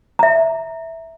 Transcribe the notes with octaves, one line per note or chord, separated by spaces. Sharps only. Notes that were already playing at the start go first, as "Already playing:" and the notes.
E5 A#5